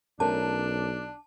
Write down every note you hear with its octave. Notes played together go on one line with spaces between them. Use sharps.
B1 A3 C#4 D4 A#4 A5